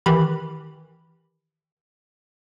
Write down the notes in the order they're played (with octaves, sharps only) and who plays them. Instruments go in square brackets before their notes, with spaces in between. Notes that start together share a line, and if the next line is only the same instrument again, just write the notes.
[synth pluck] D#3 E3 G4 B5